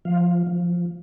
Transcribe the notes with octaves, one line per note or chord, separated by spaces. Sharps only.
F3 F5
F3